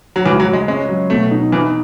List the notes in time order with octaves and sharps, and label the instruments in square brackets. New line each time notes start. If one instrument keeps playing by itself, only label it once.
[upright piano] F#3
[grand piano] C#2 [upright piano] E3
[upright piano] F#3
[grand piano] C#2
[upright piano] G#3
[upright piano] G#3 [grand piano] C#4
[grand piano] F#3
[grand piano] B2 [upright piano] A3
[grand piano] D#4
[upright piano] E3 [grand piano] D#4